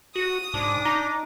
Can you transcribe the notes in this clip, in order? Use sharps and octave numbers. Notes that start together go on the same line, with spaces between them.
F#4 D#6
G#2 D4 D6
D#4 A#5